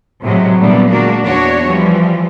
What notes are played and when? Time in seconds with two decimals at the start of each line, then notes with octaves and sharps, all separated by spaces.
0.24 A2 C3 F#3 G#3 A3
0.59 A#2 D3 E3 G3 A3 B3
0.89 G#3 A#3 D4 F#4
1.23 E2 B3 D4 F#4 C#5
1.67 E3 F3 G3